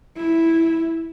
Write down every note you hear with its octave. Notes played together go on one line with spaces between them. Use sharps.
E4